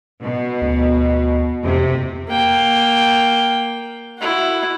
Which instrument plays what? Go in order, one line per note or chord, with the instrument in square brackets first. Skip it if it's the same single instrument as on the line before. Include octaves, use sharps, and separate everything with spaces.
[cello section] B2
[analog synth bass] D2
[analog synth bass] F2 [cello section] C3
[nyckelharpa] A#3 G5
E4 F#4